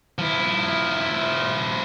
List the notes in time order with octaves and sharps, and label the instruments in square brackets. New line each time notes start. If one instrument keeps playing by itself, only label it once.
[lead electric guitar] F3 E4